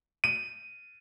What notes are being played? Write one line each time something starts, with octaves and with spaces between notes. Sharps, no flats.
D#7